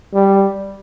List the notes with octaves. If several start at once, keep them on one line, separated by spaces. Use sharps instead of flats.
G3